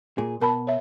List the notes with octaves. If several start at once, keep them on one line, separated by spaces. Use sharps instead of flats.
A#2 G#4
B2 A#4 A5 B5
C#5 E5